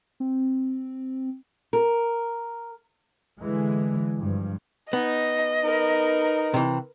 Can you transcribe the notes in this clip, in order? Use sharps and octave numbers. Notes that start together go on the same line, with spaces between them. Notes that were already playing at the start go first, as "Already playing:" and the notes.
C4
A#4
D3 E3 G#3
G2 F3
B3 D#4 D#5
D#4 A#4 B4
C3 E3